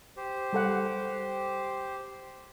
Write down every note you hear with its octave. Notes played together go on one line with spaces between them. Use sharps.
G4 C5
G3 A4 F#5